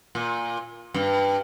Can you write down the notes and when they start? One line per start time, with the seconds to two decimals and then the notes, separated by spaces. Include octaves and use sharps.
0.15 A#2
0.94 G2